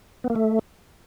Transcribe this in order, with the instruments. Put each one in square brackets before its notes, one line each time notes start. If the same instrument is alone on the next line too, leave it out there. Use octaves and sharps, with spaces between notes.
[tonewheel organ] B3
A#3
A3